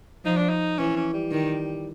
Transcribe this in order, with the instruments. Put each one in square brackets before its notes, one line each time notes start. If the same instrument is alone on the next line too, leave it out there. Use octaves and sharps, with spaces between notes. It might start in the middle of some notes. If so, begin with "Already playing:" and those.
[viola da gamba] F3 [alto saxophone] D#4
[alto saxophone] D4
D#4
[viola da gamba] E3 [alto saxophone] C#4
[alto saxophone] C#4
G3
[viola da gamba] D#3